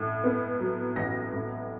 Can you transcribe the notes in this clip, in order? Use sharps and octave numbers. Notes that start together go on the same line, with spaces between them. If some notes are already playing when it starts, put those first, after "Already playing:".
Already playing: A1 A2
B3
F#3
A1 A#6
A2